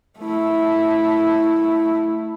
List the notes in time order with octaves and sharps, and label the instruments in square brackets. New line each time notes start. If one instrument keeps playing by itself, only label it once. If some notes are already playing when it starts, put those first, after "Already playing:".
[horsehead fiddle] A3 E4